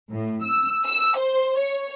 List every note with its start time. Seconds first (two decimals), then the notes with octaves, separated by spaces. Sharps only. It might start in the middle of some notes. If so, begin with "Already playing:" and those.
0.12 A2
0.45 E6
0.85 E6
1.17 C5
1.58 C#5